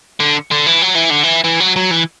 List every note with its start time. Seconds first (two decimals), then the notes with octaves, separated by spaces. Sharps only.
0.20 D3
0.51 D3
0.67 E3
0.82 F#3
0.95 E3
1.11 D3
1.24 E3
1.44 E3
1.60 F#3
1.76 F#3
1.91 E3